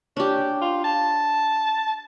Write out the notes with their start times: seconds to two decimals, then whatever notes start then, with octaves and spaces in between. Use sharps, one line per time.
0.17 C#4 D4 G4
0.61 F4
0.84 A5